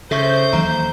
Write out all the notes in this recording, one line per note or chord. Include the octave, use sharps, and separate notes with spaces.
C#3 A4 C5 E5 C#6 G6
D#2 E3 F#3 A#5